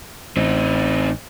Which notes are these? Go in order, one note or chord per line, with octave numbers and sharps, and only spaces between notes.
A1 C4 D#4